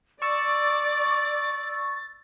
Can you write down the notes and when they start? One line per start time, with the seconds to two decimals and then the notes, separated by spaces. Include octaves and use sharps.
0.22 D5 C#6 E6 A6